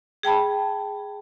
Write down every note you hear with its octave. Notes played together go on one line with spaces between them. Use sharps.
G#4 G5 A5 B5